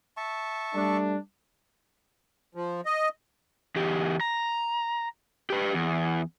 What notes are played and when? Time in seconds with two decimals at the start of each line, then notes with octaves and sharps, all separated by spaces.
0.17 E5 A5 C#6
0.74 G3 A3 D4
2.55 F3
2.86 D#5
3.76 E2 G4
4.21 A#5
5.50 G4 B4
5.74 E2